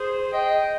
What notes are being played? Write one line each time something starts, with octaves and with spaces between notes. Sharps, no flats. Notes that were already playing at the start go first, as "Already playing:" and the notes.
Already playing: G#4 C5
D#5 G5